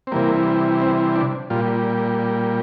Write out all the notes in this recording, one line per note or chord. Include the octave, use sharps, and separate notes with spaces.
C4
C3 E3 G3 A#3
C4
D4
A#2 G3 F4